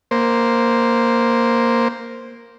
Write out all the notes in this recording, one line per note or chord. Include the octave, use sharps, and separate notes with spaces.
A#3 C5